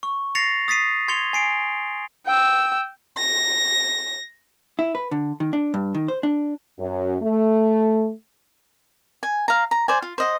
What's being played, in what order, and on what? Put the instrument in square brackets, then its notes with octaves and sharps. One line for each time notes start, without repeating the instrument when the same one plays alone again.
[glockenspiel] C#6
A6 A#6 C7 C#7 F7
D#6 A6 B6 C7 D#7
C6 G#6 C7 C#7 F7 G7
G#5 C7 D7
[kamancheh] G5 E6
[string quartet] A#6
[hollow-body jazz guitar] E4
B4
D3
D#3
D4
G2
D#3
C5
D4
[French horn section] F#2
A3
[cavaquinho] G#5
F5 A#5
A#5
C5 D5 G#5
F4
C5 D#5 F#5